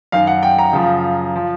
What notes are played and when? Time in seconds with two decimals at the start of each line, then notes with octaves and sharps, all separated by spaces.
0.12 F#2 D#3 F5
0.27 F#5
0.43 G5
0.58 A#5
0.73 F#2 C#3 F3
1.36 F3